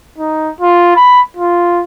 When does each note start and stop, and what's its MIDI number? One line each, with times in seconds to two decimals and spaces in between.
0.18 0.51 63
0.61 0.91 65
0.96 1.21 83
1.37 1.82 65